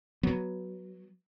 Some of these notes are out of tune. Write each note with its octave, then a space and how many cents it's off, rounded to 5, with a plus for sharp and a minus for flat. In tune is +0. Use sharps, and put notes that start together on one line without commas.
F#3 +0 B3 -10